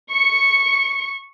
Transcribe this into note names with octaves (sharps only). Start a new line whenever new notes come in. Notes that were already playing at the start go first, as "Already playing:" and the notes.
C#6 C#7